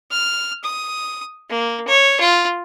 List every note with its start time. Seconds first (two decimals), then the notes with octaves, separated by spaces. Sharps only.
0.11 F6
0.64 D#6
1.49 A#3
1.87 C#5
2.20 F4